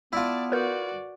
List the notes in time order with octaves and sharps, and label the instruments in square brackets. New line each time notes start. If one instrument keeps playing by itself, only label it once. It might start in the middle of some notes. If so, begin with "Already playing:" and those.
[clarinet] B3 [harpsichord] E4 F4 [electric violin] D5 A5
[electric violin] F#4 D5 [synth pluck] A#4 B4 G6